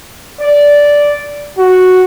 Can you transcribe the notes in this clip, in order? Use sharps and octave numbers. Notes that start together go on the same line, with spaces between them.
D5
F#4